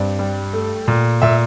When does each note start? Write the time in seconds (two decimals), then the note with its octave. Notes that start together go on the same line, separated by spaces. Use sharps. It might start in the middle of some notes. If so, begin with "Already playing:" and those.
Already playing: G2 C4 D5
0.19 G3
0.53 A3
0.88 A#2
1.22 A#2 E5